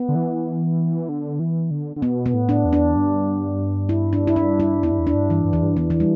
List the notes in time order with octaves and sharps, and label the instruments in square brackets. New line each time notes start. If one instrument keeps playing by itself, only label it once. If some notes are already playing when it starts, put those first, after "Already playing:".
Already playing: [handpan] B3
[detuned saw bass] D3
E3
D3
E3
D3
D3
[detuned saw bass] B2 [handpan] B3
[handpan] B3
[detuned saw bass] A2
[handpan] D4
[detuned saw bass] E2
[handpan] D4
[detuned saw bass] G2
[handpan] E4
D4
E4
D4
E4
[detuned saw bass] E2 [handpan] E4
[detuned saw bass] G2
E2
[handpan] D4
[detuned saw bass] G2
[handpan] E3
[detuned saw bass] G2
[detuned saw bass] E2 [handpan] E3
[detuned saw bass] G2
[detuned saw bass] E2 [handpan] E3
[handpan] E3
G3